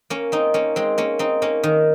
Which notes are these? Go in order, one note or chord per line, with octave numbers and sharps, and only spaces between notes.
A#3 C#4
C4 D#4
A#3 C#4
G#3 C4
A#3 C#4
C4 D#4
A#3 C#4
D#3